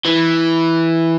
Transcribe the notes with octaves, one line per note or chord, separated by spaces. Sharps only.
E3